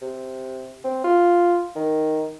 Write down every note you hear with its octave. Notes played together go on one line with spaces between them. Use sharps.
C3
C4
F4
D#3